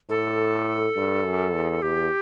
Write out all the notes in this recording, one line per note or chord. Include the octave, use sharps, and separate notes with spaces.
A2 A4
G2
F#2
E2
E2 G4